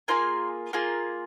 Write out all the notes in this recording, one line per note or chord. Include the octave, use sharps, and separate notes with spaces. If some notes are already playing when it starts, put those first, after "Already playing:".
A#3 F4 G#4 G#5 C6
A#3 F4 G#4